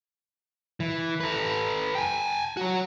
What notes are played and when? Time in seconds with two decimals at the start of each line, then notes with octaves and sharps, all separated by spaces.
0.80 E3
1.20 A4 B4
1.95 G5 G#5
2.57 F#4 C#5